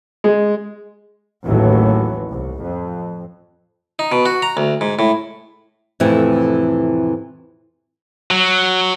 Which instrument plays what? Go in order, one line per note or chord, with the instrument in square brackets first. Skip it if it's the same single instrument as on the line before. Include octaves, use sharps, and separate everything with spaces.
[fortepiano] G#3
[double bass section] A1 D#2 A2 E3 F#3
C2
F2
[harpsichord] D#4
B2
F#4
A#5
D2
G#2
A2
[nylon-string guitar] F2 A2 C3 E3
[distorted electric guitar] F#3